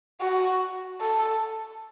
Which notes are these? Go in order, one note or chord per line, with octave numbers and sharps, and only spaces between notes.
F#4
A4